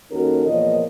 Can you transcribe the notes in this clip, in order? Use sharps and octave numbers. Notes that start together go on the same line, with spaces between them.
D#2 C#4 D#4 F#4 A4 A#4
E2 A#2 F3 A#4 C#5 D#5